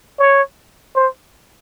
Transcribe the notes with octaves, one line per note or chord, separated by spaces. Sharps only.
C#5
C5